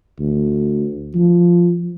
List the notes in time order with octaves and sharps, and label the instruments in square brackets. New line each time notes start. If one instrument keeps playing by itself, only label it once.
[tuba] D2
F3